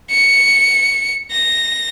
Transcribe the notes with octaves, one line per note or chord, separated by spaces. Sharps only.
C#7
A#6